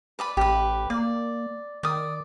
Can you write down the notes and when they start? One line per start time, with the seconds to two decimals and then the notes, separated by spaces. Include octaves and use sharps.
0.19 B4 D5 B5
0.37 A1 G4 B4
0.90 A#3 D5
1.83 D#3 D5 D#6